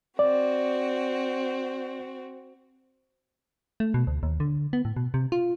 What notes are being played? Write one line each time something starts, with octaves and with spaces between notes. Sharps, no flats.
C4 F#4 D5
A3
B2
D2
D#2
D3
B3
A2
B2
C3
F4